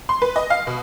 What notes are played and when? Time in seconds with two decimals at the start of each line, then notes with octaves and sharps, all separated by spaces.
0.09 C6
0.22 B4
0.36 D#5
0.50 F5
0.67 B2